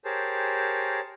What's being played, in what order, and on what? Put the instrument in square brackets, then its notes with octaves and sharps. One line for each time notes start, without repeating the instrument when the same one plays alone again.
[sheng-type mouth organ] G4 G#4 A#4 C5 C#5 A5